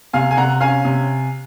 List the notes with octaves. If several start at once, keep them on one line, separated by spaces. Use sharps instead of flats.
C3 F5 G#5
G#5
C3 F#5 A#5
C#4 F5 G#5
C3